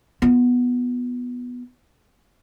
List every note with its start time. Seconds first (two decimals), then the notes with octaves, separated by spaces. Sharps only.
0.22 B3 F4